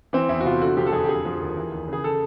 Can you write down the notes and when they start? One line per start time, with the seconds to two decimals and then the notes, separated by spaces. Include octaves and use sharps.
0.13 E3 C4
0.29 E2 E4
0.40 F#4
0.45 C3 F4
0.61 D3 F#4
0.77 F3 G4
0.87 A4
0.92 F2 G#4
1.04 G4
1.08 D3 G#4
1.25 F3
1.41 D#2
1.57 E3
1.72 D#2
1.88 C#3 G#4
2.04 A4